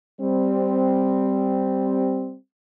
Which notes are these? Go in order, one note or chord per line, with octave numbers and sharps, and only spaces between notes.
G3 C4